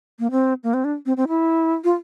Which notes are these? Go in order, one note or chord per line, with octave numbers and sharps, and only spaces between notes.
A#3
C4
A#3
C4
D4
C4
C4
E4
F4